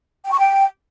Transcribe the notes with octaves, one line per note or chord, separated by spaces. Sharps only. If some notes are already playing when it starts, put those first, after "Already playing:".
G5
C#6
G5